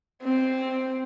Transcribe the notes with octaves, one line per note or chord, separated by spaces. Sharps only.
C4